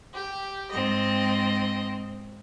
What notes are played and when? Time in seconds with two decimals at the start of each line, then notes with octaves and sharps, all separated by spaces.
0.13 G4
0.71 G#2 C4 D#5